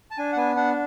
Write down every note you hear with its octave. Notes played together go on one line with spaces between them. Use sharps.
A5
D4 G#5
F#5
B3 G#5
D4 F#5